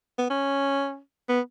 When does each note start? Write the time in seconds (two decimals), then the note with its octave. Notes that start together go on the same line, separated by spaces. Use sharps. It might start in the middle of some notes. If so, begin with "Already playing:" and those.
0.18 B3
0.30 C#4
1.29 B3